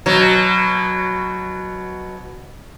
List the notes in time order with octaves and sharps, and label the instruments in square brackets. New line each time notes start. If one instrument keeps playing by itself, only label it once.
[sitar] B2 F#3